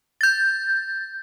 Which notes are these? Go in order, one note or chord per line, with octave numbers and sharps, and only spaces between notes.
G6 A6